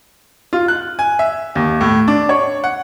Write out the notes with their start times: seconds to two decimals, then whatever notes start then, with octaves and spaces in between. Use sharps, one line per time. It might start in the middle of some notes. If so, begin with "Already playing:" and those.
0.53 F4
0.68 F#6
0.99 G#5
1.19 E5
1.55 D#2
1.81 A2
2.08 D4
2.29 C#5
2.64 F#5